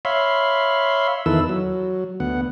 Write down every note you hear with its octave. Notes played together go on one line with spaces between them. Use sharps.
C#5 E5 F5 B5 C6
E2 D#3 E4 A4 B4 E6
F#3
D2 B3 F#5